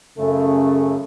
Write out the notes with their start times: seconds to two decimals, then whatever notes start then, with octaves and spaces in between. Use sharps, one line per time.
0.18 F#2 C#3 A3 A4